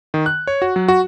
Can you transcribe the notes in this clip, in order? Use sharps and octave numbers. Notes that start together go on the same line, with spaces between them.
D#3
F#6
C#5
F#4
F#3
F#4